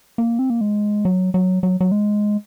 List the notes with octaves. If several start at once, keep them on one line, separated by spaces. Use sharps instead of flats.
A#3
C4
A#3
G#3
F#3
F#3
F#3
F#3
G#3